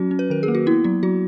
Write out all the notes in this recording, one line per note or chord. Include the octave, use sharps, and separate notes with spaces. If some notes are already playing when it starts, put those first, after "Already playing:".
Already playing: F#3 C#4 F#4
C#4
B4
D#3 A#4
G#4
A#3
F#4
B3 E4
F#3 E4
F#3 F#4